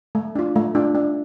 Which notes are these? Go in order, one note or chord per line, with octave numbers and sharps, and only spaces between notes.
A3
D4 F4
A3
D4 F4
D4